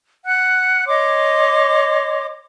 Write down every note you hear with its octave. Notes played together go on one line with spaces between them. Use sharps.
F#5 F#6
C#5 D#5 C6 D6